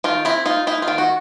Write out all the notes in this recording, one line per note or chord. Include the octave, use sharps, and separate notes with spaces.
D#3 F4
C4 E4
D#4 F4
D#4 E4
F4
D#3
F#4